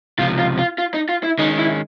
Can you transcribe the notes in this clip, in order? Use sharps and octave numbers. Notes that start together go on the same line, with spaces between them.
C#2 C3 F3 F4
F4
F4
F4
D#4
F4
E4
D#3 G#3 C#4 D#4
E4